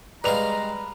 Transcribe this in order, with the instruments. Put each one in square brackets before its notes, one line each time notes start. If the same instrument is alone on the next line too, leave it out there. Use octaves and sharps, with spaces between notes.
[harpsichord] G3 G#3 F5 [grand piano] B4 F7 [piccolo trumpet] A#5